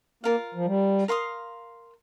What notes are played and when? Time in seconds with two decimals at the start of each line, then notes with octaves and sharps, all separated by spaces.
0.23 A#3 F4 A#4 F5
0.54 F3
0.66 G3
1.08 A#4 F5 C6 D#6